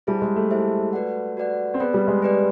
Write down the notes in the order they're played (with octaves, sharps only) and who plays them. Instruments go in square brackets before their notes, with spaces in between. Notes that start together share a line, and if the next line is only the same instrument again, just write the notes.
[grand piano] G3 [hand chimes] E4 G#4 C5 E5 A5
[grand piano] G#3
A3
[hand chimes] E4 G#4 C5 E5 A5
F#4 B4 D5 F#5
F#4 B4 D5 F#5
[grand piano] C4
[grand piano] B3 [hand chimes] G#4 B4 D5
[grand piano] G3
G#3
[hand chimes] G#4 B4 D5